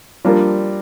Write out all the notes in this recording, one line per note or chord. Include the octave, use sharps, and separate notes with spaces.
F3 G3 A#3 D4 F4